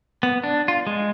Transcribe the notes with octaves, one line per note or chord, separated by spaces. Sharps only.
B3
D4
F4
G#3